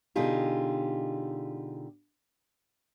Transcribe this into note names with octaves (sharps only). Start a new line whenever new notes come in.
B2 D3 D#4 F4 G4 G#4